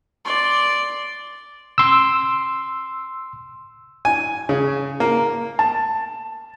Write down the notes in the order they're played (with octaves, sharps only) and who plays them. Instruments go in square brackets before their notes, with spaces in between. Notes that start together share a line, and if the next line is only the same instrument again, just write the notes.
[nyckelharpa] D5 C6
[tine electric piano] C6 E6
[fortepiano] G#5
C#3
A#3
[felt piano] A5